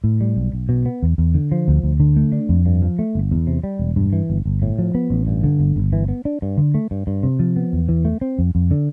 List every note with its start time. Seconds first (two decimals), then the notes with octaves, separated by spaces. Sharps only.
0.04 A2
0.21 G3
0.36 B1
0.53 B1
0.69 B2
0.86 B3
1.03 E2
1.18 E2
1.34 D3
1.52 F3
1.68 D2
1.83 D2
2.00 D3
2.16 A3
2.32 D4
2.49 F2
2.66 G2
2.82 F3
2.99 A3
3.15 G1
3.32 E2
3.47 C3
3.64 G3
3.79 E1
3.96 G2
4.13 E3
4.30 G1
4.45 G1
4.62 A2
4.79 F3
4.95 B3
5.10 A1
5.27 G2
5.44 D3
5.59 G1
5.76 G1
5.93 E3
6.08 B3
6.25 D4
6.42 G2
6.57 D3
6.74 A3
6.91 G2
7.07 G2
7.23 C3
7.40 F3
7.56 B3
7.73 E2
7.89 E3
8.05 A3
8.21 C4
8.39 F2
8.55 F2
8.71 D3